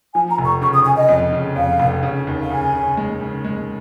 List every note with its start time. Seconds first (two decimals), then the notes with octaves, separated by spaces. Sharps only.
0.14 F3 G#5
0.30 A#5
0.38 F1
0.45 C#6
0.62 C#3 C#6
0.73 D#6
0.85 C#3 G#5
0.97 D#5
1.09 F2
1.32 C#3
1.56 F2 F5
1.80 F1
2.03 C#3
2.27 D#2
2.42 F5
2.50 C#3 G#5
2.74 C#3
2.97 G#3
3.21 C#3
3.44 G#3